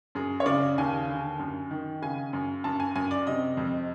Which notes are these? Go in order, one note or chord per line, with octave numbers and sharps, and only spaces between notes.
F#2 G#4
C#5
C#3 D5
D#2 G#5
D3
F#2
D#3
C#3 G#5
F#2
F#2 A5
G#5
F#2 G#5
D5
C3 D#5
F2